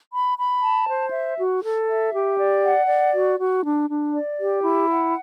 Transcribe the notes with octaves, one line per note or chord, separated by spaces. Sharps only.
B5
B5
A5
C5
E5
F#4
A4
E5
G4
D5
F#5
D5
F#4
F#4
D4
D4
D5
G4
E4
F#5